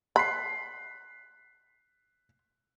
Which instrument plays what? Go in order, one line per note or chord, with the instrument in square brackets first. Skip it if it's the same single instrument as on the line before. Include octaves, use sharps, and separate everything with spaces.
[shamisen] B5 [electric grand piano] F#6 B6 C7